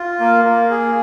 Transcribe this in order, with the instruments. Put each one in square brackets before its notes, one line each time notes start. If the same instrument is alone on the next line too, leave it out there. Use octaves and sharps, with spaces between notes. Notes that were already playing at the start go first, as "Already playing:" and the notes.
Already playing: [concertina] F4
A#3
A#3
G#4